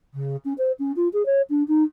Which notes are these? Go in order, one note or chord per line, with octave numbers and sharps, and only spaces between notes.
C#3
C#4
C5
C#4
F4
G#4
C#5
D4
D#4